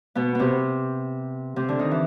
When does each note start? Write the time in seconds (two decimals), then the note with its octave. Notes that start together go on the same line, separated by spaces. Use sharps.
0.15 B2 B3
0.35 C3 B3 C4
1.56 C3 C4
1.69 D3 D4
1.79 D#3 D#4
1.91 E3